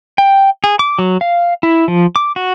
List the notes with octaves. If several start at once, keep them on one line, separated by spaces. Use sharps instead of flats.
G5
G#4
D6
F#3
F5
E4
F3
D6
F#4